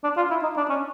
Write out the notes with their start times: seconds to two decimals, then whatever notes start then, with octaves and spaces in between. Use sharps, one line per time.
0.04 D4
0.17 F4
0.30 E4
0.43 D#4
0.57 D4
0.70 C#4